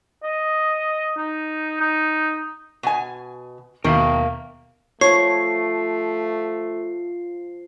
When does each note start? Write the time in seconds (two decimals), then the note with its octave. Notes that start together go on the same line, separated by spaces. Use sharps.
0.24 D#5
1.17 D#4
1.81 D#4
2.83 B2 G#5
3.84 D#2 B2 D#3 A#4 E5 F5
5.01 F3 A3 C#5 C7